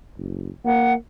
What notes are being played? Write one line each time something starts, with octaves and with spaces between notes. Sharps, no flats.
F#1
A#3 F#5